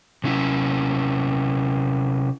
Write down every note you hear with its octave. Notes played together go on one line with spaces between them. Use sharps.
C3 C#4 E4